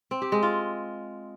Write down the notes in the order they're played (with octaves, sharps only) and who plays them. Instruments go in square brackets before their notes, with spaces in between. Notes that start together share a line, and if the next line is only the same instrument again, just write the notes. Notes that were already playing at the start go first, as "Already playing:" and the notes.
[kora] C4
G4
G#3
F4